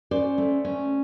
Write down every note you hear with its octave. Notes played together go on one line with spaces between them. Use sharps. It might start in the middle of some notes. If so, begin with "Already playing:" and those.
C#4 C5 D5
A3
C#4